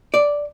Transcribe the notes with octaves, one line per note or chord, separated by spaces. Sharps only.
D5